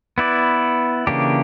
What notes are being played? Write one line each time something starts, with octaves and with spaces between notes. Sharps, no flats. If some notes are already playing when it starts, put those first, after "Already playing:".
B3 E4 B4 D5
C#3 E3 A#3 D4 G4